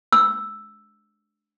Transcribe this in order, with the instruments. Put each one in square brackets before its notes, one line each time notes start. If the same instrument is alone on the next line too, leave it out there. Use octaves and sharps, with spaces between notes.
[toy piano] E6